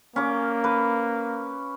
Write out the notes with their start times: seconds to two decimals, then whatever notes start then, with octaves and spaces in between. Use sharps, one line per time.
0.16 A#3 C#4 D6
0.64 B4